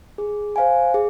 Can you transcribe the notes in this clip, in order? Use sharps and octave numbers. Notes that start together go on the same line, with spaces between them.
G#4
C5 F5 G#5
G#4